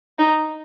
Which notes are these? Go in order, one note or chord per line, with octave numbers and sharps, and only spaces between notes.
D#4